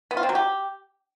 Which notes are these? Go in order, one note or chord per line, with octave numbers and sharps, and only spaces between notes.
B3
F4
C4
F#3
G4